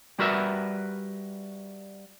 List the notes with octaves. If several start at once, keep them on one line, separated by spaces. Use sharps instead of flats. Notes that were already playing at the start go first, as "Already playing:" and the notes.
G3 F#4 A#4 B4 E5